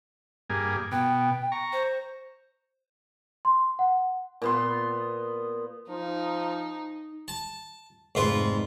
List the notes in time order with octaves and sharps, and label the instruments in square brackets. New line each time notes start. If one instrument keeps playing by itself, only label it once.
[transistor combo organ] G2 A#3 G#4
[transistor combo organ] B2 [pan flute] G5
[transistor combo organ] A#5 C#6
[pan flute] C5
[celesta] C6
F#5
[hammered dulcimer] A#2 B3 C6
[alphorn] F3 [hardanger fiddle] D#4
[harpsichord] A5
[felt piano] F1 C4 B4 [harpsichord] G#2 F4